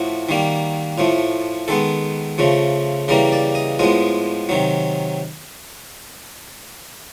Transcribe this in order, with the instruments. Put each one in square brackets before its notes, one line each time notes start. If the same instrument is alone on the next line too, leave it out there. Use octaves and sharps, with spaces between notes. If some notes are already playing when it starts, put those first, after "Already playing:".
Already playing: [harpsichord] A2 F3 A3 F#4
D#3 G3 A#3
A2 F3 A3
D#3 G#3 B3 A4
C#3 F3 A3
C#3 E3 G3 A#3 A#4
D5
D#5
A2 F3 G#3 B3 D#5
C3 D#3 F#3